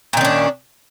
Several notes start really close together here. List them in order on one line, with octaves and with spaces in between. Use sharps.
A#2 D#3 C#4 D4